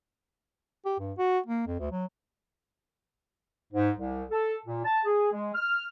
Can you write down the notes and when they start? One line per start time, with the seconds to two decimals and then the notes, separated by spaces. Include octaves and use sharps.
0.85 G4
1.00 G2
1.18 F#4
1.46 A#3
1.67 F2
1.79 D2
1.92 F#3
3.73 G#2
3.96 C2
4.30 A4
4.65 A#2
4.85 A5
5.05 G#4
5.32 G#3
5.55 F6